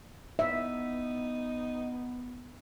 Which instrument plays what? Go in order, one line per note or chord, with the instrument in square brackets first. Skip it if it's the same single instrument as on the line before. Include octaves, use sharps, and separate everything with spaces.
[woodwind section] B3 [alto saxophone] D#4 [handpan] E5